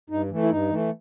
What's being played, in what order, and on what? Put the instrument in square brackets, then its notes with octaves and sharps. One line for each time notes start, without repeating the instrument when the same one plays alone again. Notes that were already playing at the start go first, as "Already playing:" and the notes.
[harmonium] G2 D#4
E3 A3
E4
G2 D#4
E3 A3